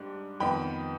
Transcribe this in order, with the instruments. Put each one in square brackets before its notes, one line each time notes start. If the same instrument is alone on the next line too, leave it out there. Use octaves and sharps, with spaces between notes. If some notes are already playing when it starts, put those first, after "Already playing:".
Already playing: [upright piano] G#2 G3 D4
F2 D#3 B3 D#4 G5 B5